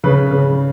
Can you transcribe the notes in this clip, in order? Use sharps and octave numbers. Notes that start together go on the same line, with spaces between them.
C#3 B4
C#3